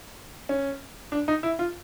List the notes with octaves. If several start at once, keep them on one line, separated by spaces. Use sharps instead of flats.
C#4
D4
D#4
E4
F4